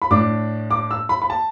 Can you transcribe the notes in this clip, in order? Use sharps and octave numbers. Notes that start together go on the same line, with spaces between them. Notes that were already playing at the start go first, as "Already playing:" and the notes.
B5
A2 A3 D4 D6
D6
E6
B5
B5
A5